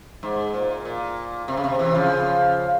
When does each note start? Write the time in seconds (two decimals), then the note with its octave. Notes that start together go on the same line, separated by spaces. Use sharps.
0.23 G#2
0.54 A#2
0.85 A#2
1.48 C3
1.57 C#3
1.64 C3
1.79 C3 E3
1.95 C#3 F3